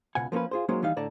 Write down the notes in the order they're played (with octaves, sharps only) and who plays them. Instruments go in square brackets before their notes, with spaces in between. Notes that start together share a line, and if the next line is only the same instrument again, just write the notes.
[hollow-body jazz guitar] C#2 B2 F#5 G#5
F3 A#3 C4 C#4 B4
F4 G#4 C5
F#3 G#3 A#3 C#4 D#4 C5
D#2 E3 G3 D#4 F5
A2 D3 D5 A5 A#5